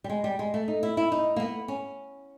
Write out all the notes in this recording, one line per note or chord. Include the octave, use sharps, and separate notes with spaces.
G3
G#3
G3
G#3
A3
D#4
E4
E4
D#4
A#3
B3
C#4